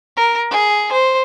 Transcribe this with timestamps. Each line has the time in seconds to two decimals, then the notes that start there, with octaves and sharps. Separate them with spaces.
0.17 A#4
0.51 G#4
0.92 C5